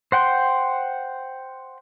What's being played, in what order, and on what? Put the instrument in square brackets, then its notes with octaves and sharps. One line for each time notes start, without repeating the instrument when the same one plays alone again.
[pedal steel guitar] C5 F#5 G5 C6